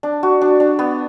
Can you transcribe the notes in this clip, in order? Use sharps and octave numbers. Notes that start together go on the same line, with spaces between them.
D4
F#4
D4
D4
B3